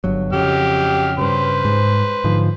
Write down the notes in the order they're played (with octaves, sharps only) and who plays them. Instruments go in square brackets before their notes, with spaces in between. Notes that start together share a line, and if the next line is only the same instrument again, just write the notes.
[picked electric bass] G1 G2 F#3
[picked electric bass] F2 C#3 [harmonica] F#3 G4 F6
[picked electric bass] G2 C#3 [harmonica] B4 C5
[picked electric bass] G#2
G#2 D3 F3